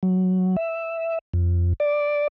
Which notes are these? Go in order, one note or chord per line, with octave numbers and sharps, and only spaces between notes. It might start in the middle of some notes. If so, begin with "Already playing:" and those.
F#3
E5
F2
D5